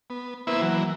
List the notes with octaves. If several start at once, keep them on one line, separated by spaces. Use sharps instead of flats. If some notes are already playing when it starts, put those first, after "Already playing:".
B3
A#3 B3 E4 B4 C5 E5
E3 F#3 A#3